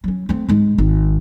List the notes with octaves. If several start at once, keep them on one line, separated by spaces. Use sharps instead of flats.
F#3 C#4
A3 C4
G#2 G#3
G#1